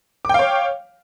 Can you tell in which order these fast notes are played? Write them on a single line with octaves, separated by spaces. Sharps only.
D6 G5 F5 C#5